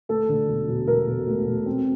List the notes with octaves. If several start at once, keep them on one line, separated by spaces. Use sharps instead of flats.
D2 A4
D3
E1
E1
E1 A#4
E1
D2
E1
C4